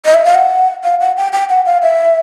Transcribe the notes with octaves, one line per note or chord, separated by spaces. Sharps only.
D#5
E5
F5
F#5
F5
F#5
G5
G5
F#5
F5
E5